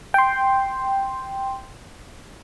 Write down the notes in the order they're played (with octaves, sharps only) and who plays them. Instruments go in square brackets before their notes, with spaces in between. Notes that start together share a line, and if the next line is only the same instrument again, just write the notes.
[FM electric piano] G5 C6